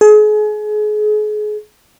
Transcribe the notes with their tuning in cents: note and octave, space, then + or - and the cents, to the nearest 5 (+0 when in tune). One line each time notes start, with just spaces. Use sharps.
G#4 +35